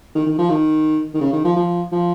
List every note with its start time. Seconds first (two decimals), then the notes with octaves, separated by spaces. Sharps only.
0.15 D#3
0.26 D#3
0.38 F3
0.50 D#3
1.14 D#3
1.21 C#3
1.32 D#3
1.44 F3
1.56 F3
1.92 F3